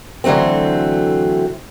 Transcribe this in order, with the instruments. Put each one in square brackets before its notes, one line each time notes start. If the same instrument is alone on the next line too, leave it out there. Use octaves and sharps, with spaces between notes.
[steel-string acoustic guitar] D3 E3 F#3 A3 C4